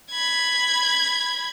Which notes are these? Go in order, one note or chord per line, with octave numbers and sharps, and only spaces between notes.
B5 G#6